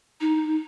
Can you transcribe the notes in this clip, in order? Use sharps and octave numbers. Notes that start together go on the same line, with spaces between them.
D#4